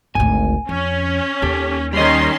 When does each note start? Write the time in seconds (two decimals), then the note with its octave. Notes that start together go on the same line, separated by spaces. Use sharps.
0.15 G#1 D2 G#5
0.69 F2 C#4
1.42 D#2 G4 A4
1.93 D#3 G3 C#4 D#5 C6